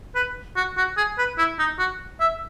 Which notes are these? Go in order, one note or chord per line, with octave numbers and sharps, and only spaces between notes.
B4
F#4
F#4
G#4
B4
E4
D#4
F#4
E5